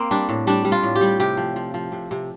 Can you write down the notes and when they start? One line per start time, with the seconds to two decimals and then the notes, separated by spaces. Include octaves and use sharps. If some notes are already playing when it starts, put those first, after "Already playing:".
Already playing: A#3 C4
0.11 G3 D4
0.29 A2
0.47 G3 D4
0.65 G3
0.72 F4
0.83 A2
0.95 G4
1.01 G3
1.20 C3 G4
1.37 F3
1.56 F3
1.74 F3
1.92 C3
2.11 C3